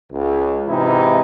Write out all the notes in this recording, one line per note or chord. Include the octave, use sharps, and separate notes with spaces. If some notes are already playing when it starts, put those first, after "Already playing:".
C#2
G#2 C3 E3 D#4 E4